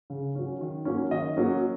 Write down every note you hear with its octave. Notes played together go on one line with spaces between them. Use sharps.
C#3
F#3 C#4
D#3
F#3 A#3 C#4
D#3 D#5
F#3 A#3 C#4